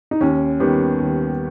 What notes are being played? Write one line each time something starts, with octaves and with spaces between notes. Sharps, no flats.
D#4
D#2 C#4
D#3 G3 B3 G4
D#2